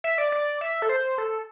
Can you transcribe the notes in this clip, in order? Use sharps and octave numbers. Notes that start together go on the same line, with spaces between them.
E5
D5
D5
E5
A4
C5
A4